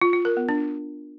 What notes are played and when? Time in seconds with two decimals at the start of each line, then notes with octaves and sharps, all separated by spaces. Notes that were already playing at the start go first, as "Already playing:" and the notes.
0.01 F4
0.13 F4
0.25 A#4
0.37 B3
0.49 D4